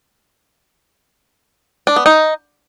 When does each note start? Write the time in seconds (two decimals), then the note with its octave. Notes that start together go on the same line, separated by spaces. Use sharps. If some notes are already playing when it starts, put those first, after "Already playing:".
1.87 D4
1.96 B3
2.06 D#4